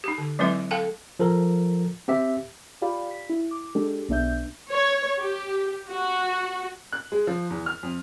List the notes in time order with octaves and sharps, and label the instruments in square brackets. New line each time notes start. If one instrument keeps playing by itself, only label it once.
[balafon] D#4 G4
D3
F#3 G#3 C4 E4 B4 E5
A4 F5 G5 A5
[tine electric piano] F3 A4 A#4
C4 G4 E5
[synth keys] F4 G4 D5 F5 B5
B6
E4
D6
G#3 D4 G4 A4
B1 B3 D4 E5 G6
[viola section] C#5
G4
F#4
[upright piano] F#6
G#3
F3
E2
F6
F2